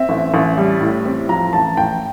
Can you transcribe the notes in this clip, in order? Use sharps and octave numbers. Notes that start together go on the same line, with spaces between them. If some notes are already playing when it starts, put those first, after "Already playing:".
Already playing: C4 E5
A1
A1
G3
A2
C4
F3 A#5
A1 A5
A1 G5